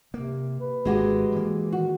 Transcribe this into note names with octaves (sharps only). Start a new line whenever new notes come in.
C3 A#3
B4
G#1 B2 G#3 F#4 G4
E3 A#3
D#3 F#4